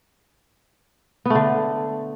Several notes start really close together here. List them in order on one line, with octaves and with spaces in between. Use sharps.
B3 A3 D3